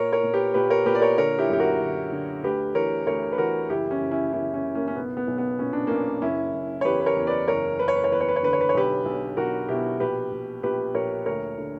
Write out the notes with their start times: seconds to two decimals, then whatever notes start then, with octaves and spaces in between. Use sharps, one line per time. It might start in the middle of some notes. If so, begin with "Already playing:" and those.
Already playing: A#2 A#4 C#5
0.12 A#4 C#5
0.23 A#2
0.34 G4 B4
0.54 A#2 G4 B4
0.70 A#4 C#5
0.85 A#2 G4 B4
0.95 D5
1.01 A#4 C#5
1.18 D3 A#4 C#5
1.38 E4 G4
1.49 F#2 G4
1.60 F#4 A#4
1.80 D3
2.12 D3
2.43 D2 G4 B4
2.75 E3 A#4 C#5
3.07 D2 A#4 C#5
3.32 B4
3.38 E3 F#4 A#4
3.69 F#1 E4 G4
3.91 C#4 E4
4.01 F#1
4.11 C#4 E4
4.33 F#1 C#4 E4
4.54 C#4 E4
4.64 F#1
4.75 A#3 C#4
4.88 C#4
4.96 B1 B3
5.17 B3
5.27 B1
5.38 B3
5.59 A#2 C#4
5.73 D4
5.87 B1 A#3 C#4
6.22 F#1 C#4 E4
6.54 F#1
6.81 C#5
6.85 E2 G4 B4
7.00 B4
7.06 A#4 C#5
7.16 E2
7.27 B4 D5
7.48 F#1 A#4 C#5
7.79 F#1 B4
7.88 C#5
7.96 B4
8.04 C#5
8.11 E2 B4
8.21 C#5
8.28 B4
8.36 C#5
8.43 D3 B4
8.53 C#5
8.61 B4
8.69 C#5
8.74 B1 G4 B4
9.06 B1
9.37 B1 F#4 A#4
9.68 B2 E4 G4
10.00 A#1 G4 B4
10.32 A#1
10.63 A#1 G4 B4
10.94 A#1 A#4 C#5
11.26 D2 A#4 C#5
11.58 D3